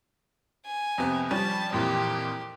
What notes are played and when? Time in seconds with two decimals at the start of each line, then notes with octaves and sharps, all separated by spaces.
0.66 G#5
0.98 F2 C3 B3
1.31 F3 G3 C#4 A5
1.72 F2 A#2 E3 G4